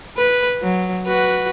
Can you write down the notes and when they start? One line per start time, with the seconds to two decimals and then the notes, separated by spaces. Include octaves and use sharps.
0.17 B4
0.63 F#3
1.07 F#4 B4